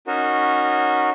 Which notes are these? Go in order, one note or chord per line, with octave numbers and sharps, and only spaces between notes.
C#4 D#4 F#4 A#4